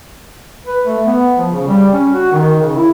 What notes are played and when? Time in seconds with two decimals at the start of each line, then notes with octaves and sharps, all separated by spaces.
0.66 B4
0.86 A3
1.06 B3
1.38 F3
1.52 C#3
1.68 G3
1.93 C#4
2.13 F#4
2.32 D#3
2.62 C#3
2.76 E4